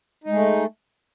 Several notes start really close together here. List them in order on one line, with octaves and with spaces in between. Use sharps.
D#4 G#3 A3